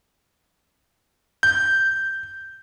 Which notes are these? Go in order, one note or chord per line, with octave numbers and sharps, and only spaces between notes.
G6